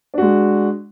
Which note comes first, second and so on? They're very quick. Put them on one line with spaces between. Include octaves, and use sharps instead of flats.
D4 F#4 G#3